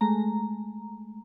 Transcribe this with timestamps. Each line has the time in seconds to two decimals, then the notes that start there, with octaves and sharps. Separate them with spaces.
0.01 G#3 A3 A#5